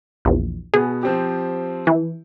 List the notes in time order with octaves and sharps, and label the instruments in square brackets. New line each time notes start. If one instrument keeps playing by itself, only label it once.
[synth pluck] A#1 E2
[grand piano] B2 B3 [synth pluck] G#4
[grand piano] F3 C4 G4
[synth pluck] E3